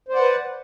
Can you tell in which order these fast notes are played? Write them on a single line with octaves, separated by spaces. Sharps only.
C5 D5 F#5 B4